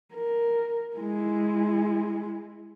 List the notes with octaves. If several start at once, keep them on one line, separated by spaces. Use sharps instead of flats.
A#4
G#3 E4